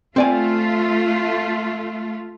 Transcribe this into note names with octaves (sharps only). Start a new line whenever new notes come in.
A3 C4 F4 D5 G#5